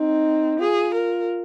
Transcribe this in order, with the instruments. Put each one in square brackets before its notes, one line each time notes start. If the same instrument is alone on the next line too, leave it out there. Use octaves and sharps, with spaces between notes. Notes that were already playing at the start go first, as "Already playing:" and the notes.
Already playing: [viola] C4 [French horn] D#4
[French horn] F4 [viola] G#4
[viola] A#4